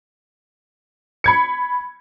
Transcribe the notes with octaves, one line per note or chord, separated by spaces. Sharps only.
B5 G#6 C#7